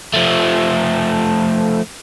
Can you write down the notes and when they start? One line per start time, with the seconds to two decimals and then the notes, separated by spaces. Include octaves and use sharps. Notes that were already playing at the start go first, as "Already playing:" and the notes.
0.13 F3 A3